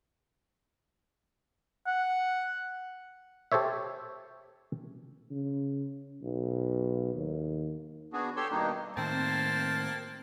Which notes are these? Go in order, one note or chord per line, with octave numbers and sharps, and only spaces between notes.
F#5
G4 A4 C5 C#5 E5
C#3
B1
D#2
B3 D4 F#4 G#4
G4 A4 C#5 C6 E6
G2 B2 D#3 A#3 D4 D#4
A2 D#3 A#3 C4 C5 A5